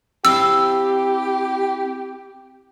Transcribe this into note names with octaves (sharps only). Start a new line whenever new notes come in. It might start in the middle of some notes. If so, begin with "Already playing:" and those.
C4 E4 G4 F5 E6